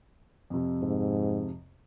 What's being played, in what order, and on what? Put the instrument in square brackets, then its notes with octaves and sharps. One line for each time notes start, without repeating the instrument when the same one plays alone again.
[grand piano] F2 C3
[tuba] G#2